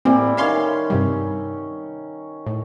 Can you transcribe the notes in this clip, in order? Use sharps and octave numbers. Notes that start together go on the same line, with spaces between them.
A2 E3 G3 A#3 C4
D#3 C#4 E5 F5 C6
G2 C3 G3
A2